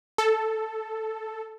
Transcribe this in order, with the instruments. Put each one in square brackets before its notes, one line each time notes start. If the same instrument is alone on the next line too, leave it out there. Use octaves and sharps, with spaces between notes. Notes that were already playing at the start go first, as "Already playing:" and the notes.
[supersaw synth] A4